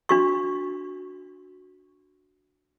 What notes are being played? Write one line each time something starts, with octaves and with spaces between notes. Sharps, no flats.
D4 F#4 C#6